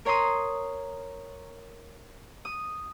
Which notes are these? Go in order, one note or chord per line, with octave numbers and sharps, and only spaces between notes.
A#4 C#5 A#5 C6 D#6
D#6